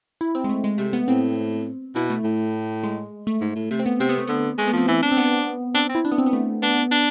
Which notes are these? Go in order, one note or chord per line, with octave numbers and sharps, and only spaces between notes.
E4
C4
G#3
A3
G#3
C3 A3
B3
A2 C4
B2 E4
A3
A2
G#3
A3
G#2
A2
C3 A3
C4
B3
C3 C4
B3
A3
D3 B3
G#3 A3
B3
F3 C4
E3 C4
D4
C4
B3
C4 D4
C4
E4
D4
B3
C4
B3
A3
B3 D4
D4